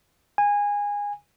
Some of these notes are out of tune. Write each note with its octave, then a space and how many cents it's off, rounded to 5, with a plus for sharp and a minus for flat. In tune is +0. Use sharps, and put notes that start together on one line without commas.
G#5 -20